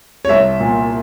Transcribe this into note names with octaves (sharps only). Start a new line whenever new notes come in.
C#5
C2 E5
A#2